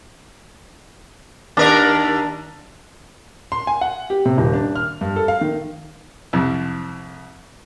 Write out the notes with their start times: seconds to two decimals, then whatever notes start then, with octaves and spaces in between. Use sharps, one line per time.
1.57 D#2 D4 A#4 D5
3.52 C6
3.67 G#5
3.81 F#5
4.10 G4
4.26 C3
4.38 D#1
4.53 D4
4.76 F6
5.01 G2
5.16 A4
5.28 F5
5.41 D#3
6.33 C2 F2